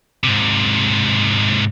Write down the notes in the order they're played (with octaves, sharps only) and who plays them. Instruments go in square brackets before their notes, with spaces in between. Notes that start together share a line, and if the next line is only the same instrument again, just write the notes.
[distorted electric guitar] G#2 C3